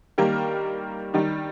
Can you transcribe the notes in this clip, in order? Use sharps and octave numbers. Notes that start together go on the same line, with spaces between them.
D#3 G3 A#3 G4 A#4
D#3 G3 D#4